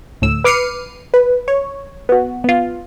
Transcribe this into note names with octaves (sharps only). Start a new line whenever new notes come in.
D2 A2 E6
B4 D6 F6 C7 C#7 D#7
B4
C#5
B3 F#4
B3 F4